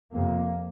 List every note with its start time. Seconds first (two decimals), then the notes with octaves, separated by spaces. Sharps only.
0.13 F2 C3 A#3